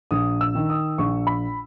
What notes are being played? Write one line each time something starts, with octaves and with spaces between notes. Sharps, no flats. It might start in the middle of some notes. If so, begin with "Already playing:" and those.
A#1 D#6
E6
D#3
D#6
A#1 C#6
B5